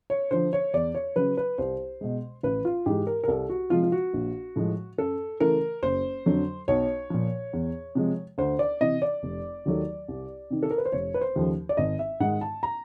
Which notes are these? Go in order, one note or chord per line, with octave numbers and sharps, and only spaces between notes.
C#5
D3 F3 C5
C#5
E2 D5
C#5
C#3 F#3 B4
B4
C2 C5
B2 G#3
A1 B4
F4
G#2 E3 G#3 G4
A#4
A#4
C2 A4
F#4
C3 F3 G#3 F4
F4
F#4
A#1
A2 F3 G#3
F#2 A4
C#3 E3 A3 A#4
F#1 C5
F2 D3 F#3
B1 C#5
A#2 F3
E2
C3 F3 G#3
D2 C5
D5
C3 E3 D#5
D5
F1
D#2 D#3 F#3 A3
C2
C3 D#3
A4
A#4
B4
C5
F1 C#5
B4
C5
D#2 C#3 F3 A3
D5
G#1 D#5
E5
G#2 D#3 G#3 F#5
A5
A#5